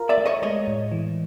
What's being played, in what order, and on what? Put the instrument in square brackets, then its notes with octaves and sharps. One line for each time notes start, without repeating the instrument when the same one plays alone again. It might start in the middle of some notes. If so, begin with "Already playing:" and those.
Already playing: [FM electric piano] F4 A#4
[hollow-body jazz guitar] D5 E5
[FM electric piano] A3
[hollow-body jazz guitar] C#5 D#5
[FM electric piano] G#3 [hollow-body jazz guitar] C#5 D#5
[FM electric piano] A2
E3